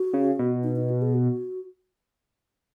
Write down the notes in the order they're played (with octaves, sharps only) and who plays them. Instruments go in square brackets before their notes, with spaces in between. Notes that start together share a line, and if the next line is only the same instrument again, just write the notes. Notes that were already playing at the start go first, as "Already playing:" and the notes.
Already playing: [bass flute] F#4
[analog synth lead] C#3
B2
[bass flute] D#4
D#4
F#4
G#4
F#4